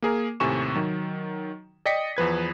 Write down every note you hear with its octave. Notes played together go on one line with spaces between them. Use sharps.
A#3 G#4 A#4
D#2 A2 C3 G#5 C#6 E7
D#3 F#3
D5 D#5 G5 D#6 B6 C#7
E2 F3 B4 G#6